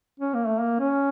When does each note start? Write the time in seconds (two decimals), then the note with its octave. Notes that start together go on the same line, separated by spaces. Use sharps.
0.20 C#4
0.34 A#3
0.47 A3
0.61 A#3
0.80 C#4